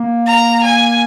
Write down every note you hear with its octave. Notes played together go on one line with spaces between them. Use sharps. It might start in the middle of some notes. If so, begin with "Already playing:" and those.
Already playing: A#3
A#5
G#5